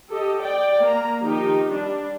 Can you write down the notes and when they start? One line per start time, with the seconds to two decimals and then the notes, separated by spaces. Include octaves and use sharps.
0.11 G4 A4 D#5
0.41 D5 G5
0.80 A#3 A#5
1.22 D#3 F3 D#4 G4
1.69 G3 D4